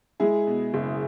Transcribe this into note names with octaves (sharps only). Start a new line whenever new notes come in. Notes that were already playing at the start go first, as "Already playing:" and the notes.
G#3 E4 G#4
B2
F#1